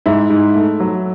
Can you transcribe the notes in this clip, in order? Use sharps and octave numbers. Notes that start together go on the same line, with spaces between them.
G#2 E4
G#2
A3
F#3